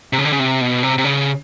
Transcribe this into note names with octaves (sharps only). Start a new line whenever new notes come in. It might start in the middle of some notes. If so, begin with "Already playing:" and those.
C3
C#3
D3
C#3
C3
B2
C3
C3
C#3